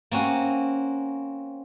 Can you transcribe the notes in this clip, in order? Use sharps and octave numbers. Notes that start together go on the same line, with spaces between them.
A#3 C4 C#4 F#4